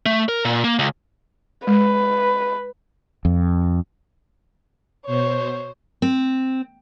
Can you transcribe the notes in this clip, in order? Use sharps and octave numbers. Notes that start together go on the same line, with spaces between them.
A3
A#4
A#2
A#3
C#2
G#3 B4
F2
B2 C5 C#5
C4